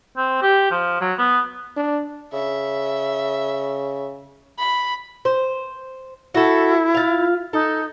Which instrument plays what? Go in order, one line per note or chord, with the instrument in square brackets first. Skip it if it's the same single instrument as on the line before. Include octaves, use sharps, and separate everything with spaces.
[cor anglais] C4
G4
F3
F#3
B3
[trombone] D4
[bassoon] C#3 [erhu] E5
[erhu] B5
[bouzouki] C5
[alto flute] E4 [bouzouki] F#4 A4
[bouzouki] F4 F5
[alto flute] D#4 [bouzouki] A4